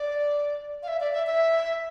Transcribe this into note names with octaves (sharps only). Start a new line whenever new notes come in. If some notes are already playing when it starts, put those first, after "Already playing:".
Already playing: D5
F5
E5
D5
E5
E5